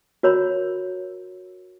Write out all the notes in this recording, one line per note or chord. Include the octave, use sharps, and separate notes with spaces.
F#4 A#4 C#5 A#5 B5